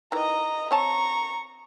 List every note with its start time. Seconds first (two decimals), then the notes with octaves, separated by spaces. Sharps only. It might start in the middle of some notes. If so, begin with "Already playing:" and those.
0.12 D#3 E3 D#5 A#5
0.71 C4 C#5 A5 A#5 C#6